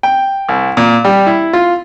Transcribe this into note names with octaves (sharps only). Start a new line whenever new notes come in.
G5
C2
A#2
G3
E4
F4